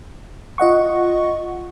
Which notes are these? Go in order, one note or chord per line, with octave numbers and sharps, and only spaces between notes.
F4 D#5 F#5 C#6